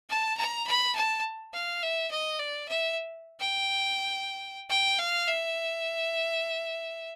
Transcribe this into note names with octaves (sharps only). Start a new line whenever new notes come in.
A5
A#5
B5
A5
F5
E5
D#5
D5
E5
G5
G5
F5
E5